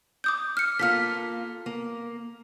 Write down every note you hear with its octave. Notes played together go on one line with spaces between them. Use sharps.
D6 D#6 G6
F6 C#7
A#3 F4 A4 F6 B6
A#3